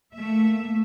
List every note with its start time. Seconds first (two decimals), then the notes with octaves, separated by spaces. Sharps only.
0.14 A3 A#3 E5